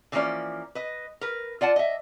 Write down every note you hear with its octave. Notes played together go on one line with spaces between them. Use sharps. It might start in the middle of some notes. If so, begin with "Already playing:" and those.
D3 E3 F3 A#3 C#4 D5
B4 D#5
A#4 B4
F4 D5 F#5 A5
D#5 E5